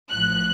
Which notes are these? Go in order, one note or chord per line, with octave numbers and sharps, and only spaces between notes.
A1 A2 F3 F#6